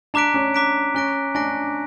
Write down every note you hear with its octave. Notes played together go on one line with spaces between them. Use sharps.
D4 A#5 D6 F#6 B6 D7
C#4
A#5 D6 F#6 B6 D7
C#4 G#5 C#6 F#6 A#6 D7
D4 G#5 C#6 F#6 A#6 D7